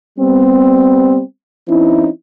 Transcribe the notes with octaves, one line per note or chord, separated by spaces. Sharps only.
G3 B3 C4
E3 C4 C#4 D#4 E4